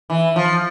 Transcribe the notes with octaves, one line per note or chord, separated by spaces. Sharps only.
E3
F3